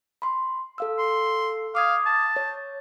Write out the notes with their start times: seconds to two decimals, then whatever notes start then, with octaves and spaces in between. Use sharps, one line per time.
0.22 B5 C6
0.78 A4 F5 E6
0.99 C6
1.75 F5 D6 D#6 G#6
2.06 A5
2.36 C#5